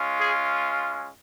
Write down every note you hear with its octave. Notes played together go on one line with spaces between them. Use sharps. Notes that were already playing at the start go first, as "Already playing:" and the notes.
Already playing: G#3 C#4 F4
G#4